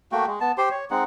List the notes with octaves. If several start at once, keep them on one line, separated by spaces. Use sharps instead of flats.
A3 A#3 F#4 G5
G#3
B3 A5
G4 C5 C6
C#5
G#3 C4 D#4 F#5